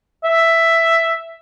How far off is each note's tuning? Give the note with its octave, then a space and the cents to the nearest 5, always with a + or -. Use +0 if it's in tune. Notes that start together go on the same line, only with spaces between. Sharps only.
E5 +5